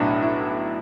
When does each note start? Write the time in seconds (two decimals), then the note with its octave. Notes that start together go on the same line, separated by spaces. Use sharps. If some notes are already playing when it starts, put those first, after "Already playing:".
Already playing: B1 A2 F#3 B3 D4 E4
0.22 E4